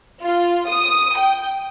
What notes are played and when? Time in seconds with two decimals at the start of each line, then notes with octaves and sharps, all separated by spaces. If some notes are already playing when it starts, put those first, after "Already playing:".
0.22 F4
0.69 D#6
1.16 G5